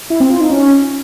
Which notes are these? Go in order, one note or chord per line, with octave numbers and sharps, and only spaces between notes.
E4
C4
F4
D#4
C#4